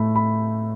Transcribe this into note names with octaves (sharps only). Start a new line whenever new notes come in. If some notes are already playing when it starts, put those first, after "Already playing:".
Already playing: A2 A3 B5
B5